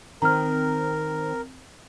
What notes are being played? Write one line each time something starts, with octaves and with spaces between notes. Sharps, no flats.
D#3 C4 A#4 A#5 F6